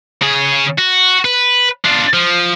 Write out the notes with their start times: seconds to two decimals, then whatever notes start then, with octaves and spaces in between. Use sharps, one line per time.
0.21 C#3 G#4
0.78 F#4
1.25 B4
1.85 D4 F4
2.13 F3